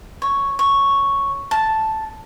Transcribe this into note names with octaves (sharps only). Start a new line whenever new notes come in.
C#5
C#5
A5